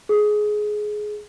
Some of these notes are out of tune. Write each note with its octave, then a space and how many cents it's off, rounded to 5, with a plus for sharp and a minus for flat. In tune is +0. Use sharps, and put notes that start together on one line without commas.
G#4 +15